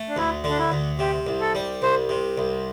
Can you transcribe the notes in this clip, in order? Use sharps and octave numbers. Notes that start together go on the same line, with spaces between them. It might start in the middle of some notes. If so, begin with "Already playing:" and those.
Already playing: A3
D4
D2 E4
D3 D4
E4
D2
C3 G4
C2
A4
G3
C2 C5
C3
C2